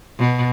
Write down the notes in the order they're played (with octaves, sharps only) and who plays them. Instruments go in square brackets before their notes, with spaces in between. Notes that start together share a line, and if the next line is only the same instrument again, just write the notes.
[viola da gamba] B2